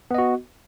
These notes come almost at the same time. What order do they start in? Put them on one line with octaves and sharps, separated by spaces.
B3 D#5 F#4